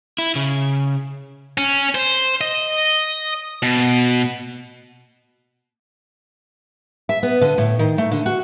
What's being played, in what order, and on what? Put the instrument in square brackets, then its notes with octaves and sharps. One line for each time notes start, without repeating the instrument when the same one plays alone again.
[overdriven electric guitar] E4
C#3
[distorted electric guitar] C#4
C5
D#5
B2
[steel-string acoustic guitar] E5
B3
D3
A2
D#3
A3
D3
F#4